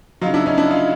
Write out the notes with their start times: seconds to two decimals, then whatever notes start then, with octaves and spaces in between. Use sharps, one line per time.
0.21 F#3 D#4 F4
0.26 C#3
0.34 D4 E4
0.46 C#4 D#4
0.58 D4 E4
0.70 D#4 F4